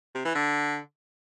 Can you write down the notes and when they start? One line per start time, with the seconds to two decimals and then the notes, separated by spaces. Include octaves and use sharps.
0.15 C3
0.25 E3
0.35 D3